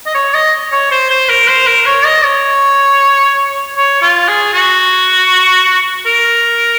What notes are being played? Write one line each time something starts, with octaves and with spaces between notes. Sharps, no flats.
D#5
C#5
D#5
C#5
C5
C5
A#4
C5
A#4
C#5
D#5
C#5
C#5
F4
G#4
F#4
A#4